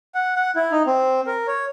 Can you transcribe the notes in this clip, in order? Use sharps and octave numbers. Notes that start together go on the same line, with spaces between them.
F#5
F#5
E4
D#4
C4
A#4
C#5